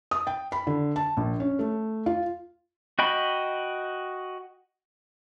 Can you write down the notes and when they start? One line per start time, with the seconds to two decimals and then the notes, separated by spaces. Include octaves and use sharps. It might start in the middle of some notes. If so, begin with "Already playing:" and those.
0.11 D#6
0.27 G5
0.52 B5
0.67 D3
0.96 A5
1.17 A#1
1.40 C#4
1.59 A3
2.06 F4
2.99 F#4 D#5 G5 B5